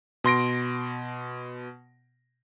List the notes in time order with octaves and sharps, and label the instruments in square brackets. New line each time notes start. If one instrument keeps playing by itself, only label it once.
[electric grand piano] B2 C6 A#6 D7